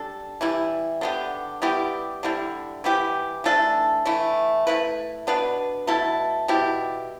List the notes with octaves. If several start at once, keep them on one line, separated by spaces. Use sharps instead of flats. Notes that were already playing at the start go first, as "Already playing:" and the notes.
Already playing: G3 D4 A4
E3 G3 E4
D3 B3 G4
G3 B3 E4 G4
D3 G3 E4
E3 B3 E4 G4
E3 A3 D4 A4
E3 A3 E4
A3 E4 B4
B2 B3 D4 B4
B2 A3 E4 A4
B2 G3 E4 G4